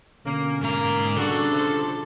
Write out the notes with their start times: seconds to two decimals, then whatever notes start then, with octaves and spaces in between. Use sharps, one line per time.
0.25 B2 D3 A#3 C#4
0.62 G#2 A#3 A#5
1.17 G2 C#3 G3 D4 F#4 A4
1.50 F3